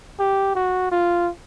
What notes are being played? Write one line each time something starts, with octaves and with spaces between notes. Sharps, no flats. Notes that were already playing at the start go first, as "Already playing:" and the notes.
G4
F#4
F4